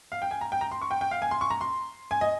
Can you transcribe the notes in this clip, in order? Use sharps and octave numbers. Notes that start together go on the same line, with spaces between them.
F5
G5
G#5
A#5
G5
A#5
C6
C#6
G5
G5
F5
G#5
C6
C#6
A#5
C6
G#5
D#5